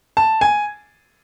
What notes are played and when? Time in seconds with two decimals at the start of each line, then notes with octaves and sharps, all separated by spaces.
0.17 A5
0.41 G#5